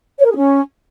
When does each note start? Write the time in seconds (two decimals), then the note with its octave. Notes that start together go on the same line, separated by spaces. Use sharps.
0.19 C#5
0.25 A#4
0.30 G#4
0.36 C#4